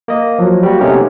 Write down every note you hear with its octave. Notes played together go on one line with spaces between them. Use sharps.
A#3 D#5
F3 F#3
G3 A#3 F#4
C3 A3 B3 C#4 D#4 G4